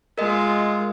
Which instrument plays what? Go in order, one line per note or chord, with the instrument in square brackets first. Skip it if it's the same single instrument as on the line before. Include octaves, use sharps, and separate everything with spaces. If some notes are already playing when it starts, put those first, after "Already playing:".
[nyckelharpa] G#3 F4 [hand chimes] A#4 D#5